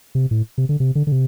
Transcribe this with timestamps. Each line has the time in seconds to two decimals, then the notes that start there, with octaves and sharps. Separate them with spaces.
0.15 C3
0.31 A2
0.58 C3
0.69 D3
0.80 C3
0.95 D3
1.07 D3
1.12 C3